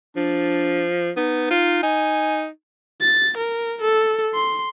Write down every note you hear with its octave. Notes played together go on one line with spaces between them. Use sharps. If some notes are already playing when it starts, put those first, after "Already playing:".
F3 D4
B3 D#4
F4
D#4 G#5
A6
A#4
A4
C6